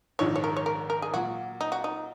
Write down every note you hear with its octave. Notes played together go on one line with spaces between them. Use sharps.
A#1 G#2 D#3 G#3 C#5
C#5
A#4
C#5
A#4
A#4
G#4
A#2 F#3 A#3 F#4
D#4
F#4
D#4